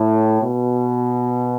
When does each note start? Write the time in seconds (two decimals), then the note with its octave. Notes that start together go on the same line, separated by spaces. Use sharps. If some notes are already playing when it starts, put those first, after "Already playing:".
Already playing: A2
0.42 B2